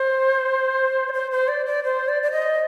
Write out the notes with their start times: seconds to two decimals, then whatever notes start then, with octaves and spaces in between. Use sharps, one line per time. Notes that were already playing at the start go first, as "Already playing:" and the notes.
Already playing: C5
1.09 D5
1.13 C5
1.31 C5
1.48 D5
1.66 D5
1.84 C5
2.08 D5
2.23 D5
2.31 D#5